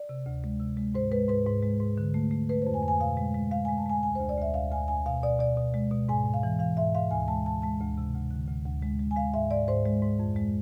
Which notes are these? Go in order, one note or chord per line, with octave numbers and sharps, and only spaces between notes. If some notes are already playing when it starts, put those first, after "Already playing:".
Already playing: D5
C3
D2
G#3
C3
G#3
G#2 C5
G#3 B4
G#2 B4
G#2
G#3
G#2
D3
A3
A3
A3 B4
F2 C5
G#5
F2
G#5
B2 F5
G#3
G#3
G#3 F5
G#3 G#5
A5
G#3 G#5
D2 G#5
D2 C5
D5
D2 E5
D2 F5
D2 G#5
D2 G#5
B2 F5
B2 D5
B2 D5
B2
G#3
B2
G#2 G#5
G#2
F5
E3
E3 F5
G#2 E5
G#2 F5
D2 G#5
G#3 A5
D2 A5
G#3 A5
D2
C3
D2
D3
D2
D2
G#3
G#3
G#5
G#3 F5
G#2 E5
G#2 D5
G#2 C5
G#3
G#2
F2
G#3